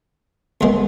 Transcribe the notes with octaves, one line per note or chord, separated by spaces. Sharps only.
E2 D#3 G#3 B3